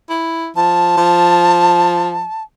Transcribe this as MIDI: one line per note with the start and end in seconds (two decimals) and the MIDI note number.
0.10 0.50 64
0.56 0.93 53
0.56 2.43 81
0.97 2.26 53